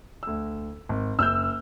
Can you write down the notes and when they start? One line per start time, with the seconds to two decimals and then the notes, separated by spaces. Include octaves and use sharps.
0.23 D2 E6
0.89 G#1
1.19 F#1 E6 F6 G6